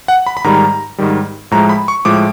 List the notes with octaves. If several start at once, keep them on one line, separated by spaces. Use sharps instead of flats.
F#5
B5
B5
G#2 D#3 G3 A#5
G#2 D#3 G3
A2 F3 G#3 A#5
B5
C#6
A2 F3 G#3 D6